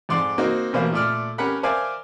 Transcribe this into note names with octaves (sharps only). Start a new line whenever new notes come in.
F2 G#2 D5 C6
A#3 C4 D#4 F#4
A1 B2 A#3 C5 F5
A#2 A3 D5 F6
C#4 G4 A#4 F#5 B5
A#4 C5 D5 E5 F5 G#5